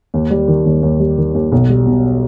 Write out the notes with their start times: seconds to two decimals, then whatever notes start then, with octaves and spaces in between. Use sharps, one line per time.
0.14 D#2
0.31 G3
0.48 D#3
0.66 D#2
0.83 D#2
1.00 G3
1.18 D#3
1.35 D#2
1.52 B1
1.70 G3
1.87 B2